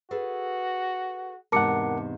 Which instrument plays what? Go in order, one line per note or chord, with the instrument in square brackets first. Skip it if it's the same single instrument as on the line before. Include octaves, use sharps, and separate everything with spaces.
[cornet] F#4 [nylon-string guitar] G#4 A4 B4
[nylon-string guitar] E2 G#2 C3 [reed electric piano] A#4 F#5 [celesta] A5 D6 C#7